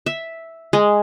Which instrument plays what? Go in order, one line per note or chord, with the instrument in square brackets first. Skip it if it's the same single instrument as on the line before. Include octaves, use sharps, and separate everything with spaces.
[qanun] E5
G#3